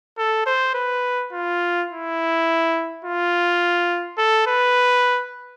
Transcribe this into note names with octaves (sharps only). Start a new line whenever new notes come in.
A4
C5
B4
F4
E4
F4
A4
B4